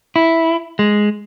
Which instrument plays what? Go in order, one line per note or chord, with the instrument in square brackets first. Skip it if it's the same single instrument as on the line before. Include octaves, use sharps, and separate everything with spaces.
[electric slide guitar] E4
G#3